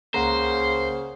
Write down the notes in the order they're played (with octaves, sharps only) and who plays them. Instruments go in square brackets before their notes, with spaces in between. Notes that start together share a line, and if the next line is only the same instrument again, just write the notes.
[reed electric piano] C#2 F#5 A#5 [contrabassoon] C#3 [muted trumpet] A#3 [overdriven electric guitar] C5